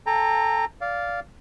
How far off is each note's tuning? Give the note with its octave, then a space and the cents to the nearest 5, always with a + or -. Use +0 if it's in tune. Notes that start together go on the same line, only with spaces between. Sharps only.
A4 +0 G5 +35 A#5 -10
D5 -15 F5 +0